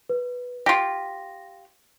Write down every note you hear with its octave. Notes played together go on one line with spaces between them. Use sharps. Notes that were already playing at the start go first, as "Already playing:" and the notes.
B4
F4 G4 A#6